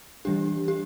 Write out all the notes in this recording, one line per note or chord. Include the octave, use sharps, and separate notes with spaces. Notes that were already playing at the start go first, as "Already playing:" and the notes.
E3 G3 D4 G4
G4